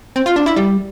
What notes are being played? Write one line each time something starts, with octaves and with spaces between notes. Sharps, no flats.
C4
F4
D4
E4
G3